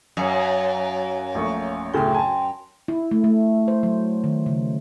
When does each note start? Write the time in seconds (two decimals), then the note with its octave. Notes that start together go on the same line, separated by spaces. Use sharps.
0.17 F#2 C#5 F5 G#5
1.35 A#1 A3 C#6
1.94 D2 A2 C#3 G5 C6
2.15 G#5 A5
2.88 E4
3.11 A3
3.24 A3
3.68 C5
3.83 F#3
4.24 D#3
4.46 C#3